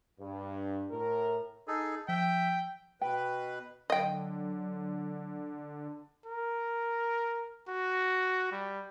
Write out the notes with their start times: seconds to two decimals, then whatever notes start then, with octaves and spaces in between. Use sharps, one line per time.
0.20 G2
0.91 A2 A#4
1.68 D#4 G#4 A4
2.09 F3 E5 G5
3.01 B2 B4 G5
3.90 D3 F#3 D#5 G5
6.26 A#4
7.68 F#4
8.52 G3